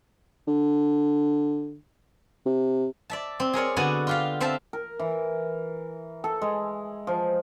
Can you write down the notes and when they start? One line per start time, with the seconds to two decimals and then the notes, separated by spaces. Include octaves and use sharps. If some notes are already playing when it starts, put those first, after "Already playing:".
0.47 D3
2.46 C3
3.10 D5 E5 A5
3.40 C4
3.53 G#4 A#4 C#5 D5
3.76 D3 B3 F#4 D5 G#5
4.07 F4 G4 F5
4.40 C4 C5 E5 F5 A5
4.73 A#4
4.99 E3
6.24 A4
6.42 G#3
7.07 F3